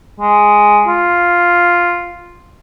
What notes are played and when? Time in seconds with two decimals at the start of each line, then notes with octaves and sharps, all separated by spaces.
0.20 G#3
0.87 F4